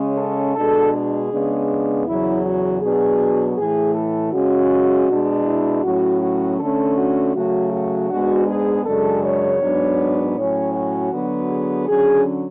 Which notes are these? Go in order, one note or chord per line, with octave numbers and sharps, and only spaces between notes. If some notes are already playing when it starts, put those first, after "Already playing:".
Already playing: C#3 G#3 C#4
A4
B2 G#3 D4 A4
G#4
C#3 G#3 B3 D4
E2 C#3 F#3 E4
F#4
B2 F#3 B3 D4 G#4
A2 E3 A3 G#4
A4
C#3 G#3 C#4 F#4
B2 G#3 D4
E4
A2 F#3 C#4 F#4
F#4
D3 A3 C#4 A4
F#4
C#3 F#3 A3 F#4
F#4
G#2 G#3 B3 D4 F#4
G#4
F#2 C#3 G#3 D4 A4
C#5
G#2 F#3 B3 D4
A2 F#3 C#4 C#5
F#4
D3 F#3 B3
G#4
D3 F#3 C#4 G#4